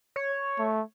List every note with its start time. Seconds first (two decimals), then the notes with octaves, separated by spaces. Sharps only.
0.16 C#5
0.59 A3